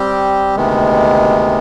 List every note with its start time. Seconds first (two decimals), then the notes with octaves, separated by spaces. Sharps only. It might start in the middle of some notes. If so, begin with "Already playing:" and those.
Already playing: G3 C4 G4
0.56 D2 C3 D#3 G#3 B3